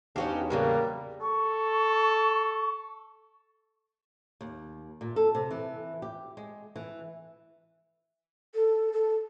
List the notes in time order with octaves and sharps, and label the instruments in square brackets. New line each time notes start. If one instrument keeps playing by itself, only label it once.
[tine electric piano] E2 D4 F5 [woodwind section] G#2 B2 [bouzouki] C#4 F#4 G4
[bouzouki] A2 C#3 F#3 [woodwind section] G3 [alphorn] A#3
[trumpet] A4 [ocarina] C#6
[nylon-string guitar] D#2
A#2
A4
C3
E3
G4
G#3
E3
[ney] A4
A4